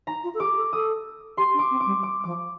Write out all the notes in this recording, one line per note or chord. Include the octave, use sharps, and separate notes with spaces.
D#4 A#5
F4
A4
G4 D6
A4
A4 D#6
G4 C6
D4
D6
C4
D6
G3
D6
F3 D6